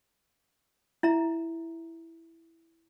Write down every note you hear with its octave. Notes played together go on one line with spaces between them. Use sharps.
E4 E5 A#5